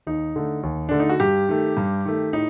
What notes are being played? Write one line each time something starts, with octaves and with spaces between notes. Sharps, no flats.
D#2 D#4
D3 A3
D#2
D3 A3 D4
D#4
F#4
G2 G4
D#3 A3
G2
D#3 A3
A2 D#4